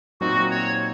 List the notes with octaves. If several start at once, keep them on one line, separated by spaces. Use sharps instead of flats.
A#2 F#3 C4 D#4 F#4
C#5